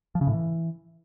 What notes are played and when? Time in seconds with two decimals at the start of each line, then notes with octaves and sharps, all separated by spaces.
0.15 F3
0.21 C#3
0.27 A2
0.33 E3